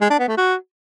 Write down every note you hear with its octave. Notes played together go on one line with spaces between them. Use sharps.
G#3
D4
B3
A3
F#4